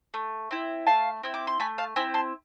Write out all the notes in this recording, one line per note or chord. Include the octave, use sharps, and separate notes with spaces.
A3
C4 E4
A3 F5 A5
C4 E4
D6
C6
A3 G#5 B5
F5 A5
C4 E4 G#5 B5
A5 C6